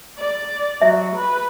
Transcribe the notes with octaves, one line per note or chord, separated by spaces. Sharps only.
D5
F#3 E5
B4